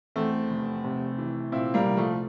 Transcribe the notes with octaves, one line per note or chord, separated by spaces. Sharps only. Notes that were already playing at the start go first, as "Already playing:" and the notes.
E2 A3 C4
F1
C3
E3
A#2 C4 E4
G3 A#3
C2
F3 A3